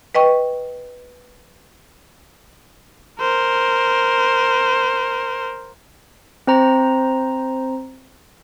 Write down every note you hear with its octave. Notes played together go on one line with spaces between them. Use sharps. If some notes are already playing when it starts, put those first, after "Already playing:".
B4 D#5 G5 C#6
A#4 C5
C4 C5 A#5